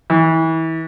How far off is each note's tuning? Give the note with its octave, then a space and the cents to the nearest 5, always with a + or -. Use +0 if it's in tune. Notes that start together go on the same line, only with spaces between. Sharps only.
E3 -30